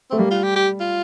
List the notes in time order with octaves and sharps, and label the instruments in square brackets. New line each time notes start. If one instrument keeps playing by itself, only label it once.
[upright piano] A3 [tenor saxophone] C4
[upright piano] G3 [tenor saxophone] A#3
[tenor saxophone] F4
G4
G4
F4